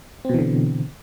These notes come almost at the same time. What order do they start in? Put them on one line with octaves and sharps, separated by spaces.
C4 B2 E3 D3